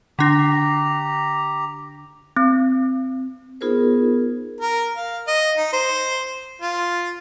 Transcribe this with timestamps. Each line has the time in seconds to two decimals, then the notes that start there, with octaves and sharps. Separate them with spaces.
0.19 D3 D4 G4 A#5 A#6
2.37 C4
3.61 B3 D#4 F4 G#4 A#4 C5
4.60 A#4
4.97 F5
5.27 D#5
5.58 D#4
5.73 C5
6.62 F4